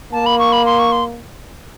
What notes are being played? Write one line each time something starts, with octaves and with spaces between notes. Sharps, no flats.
A#3 A5
B5
C#6
B5
C6
C#6
C6